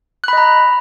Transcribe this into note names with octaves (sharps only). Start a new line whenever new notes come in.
D#5 A#5 B5 F#6